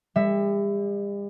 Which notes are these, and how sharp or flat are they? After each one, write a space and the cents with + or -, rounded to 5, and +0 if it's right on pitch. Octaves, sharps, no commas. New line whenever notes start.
G3 +45 E5 +5